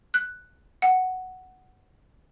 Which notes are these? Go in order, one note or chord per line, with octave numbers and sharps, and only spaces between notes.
F#6
F#5